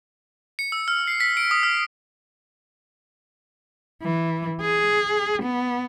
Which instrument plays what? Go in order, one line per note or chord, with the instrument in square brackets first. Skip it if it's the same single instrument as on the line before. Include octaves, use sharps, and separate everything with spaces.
[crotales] C#7
E6
F6
C7
B6
D7
D#6
F6
[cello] E3
G#4
B3